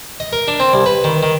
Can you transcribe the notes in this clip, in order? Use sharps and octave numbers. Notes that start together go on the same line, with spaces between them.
D#5
A#4
D4
C4
C2
B4
D#3
D#3